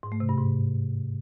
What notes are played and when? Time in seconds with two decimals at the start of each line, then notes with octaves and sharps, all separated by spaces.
0.03 G#2
0.12 A3
0.20 C3
0.29 G2
0.38 G#2